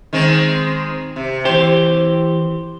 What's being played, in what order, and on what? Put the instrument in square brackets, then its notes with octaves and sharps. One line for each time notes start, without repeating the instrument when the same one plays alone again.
[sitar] D#3 G#3 C4
C3
[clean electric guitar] E3 G4 [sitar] C5